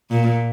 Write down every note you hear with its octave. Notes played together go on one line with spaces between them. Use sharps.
A#2